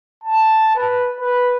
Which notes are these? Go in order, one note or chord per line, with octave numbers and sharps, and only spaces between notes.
A5
B4
B4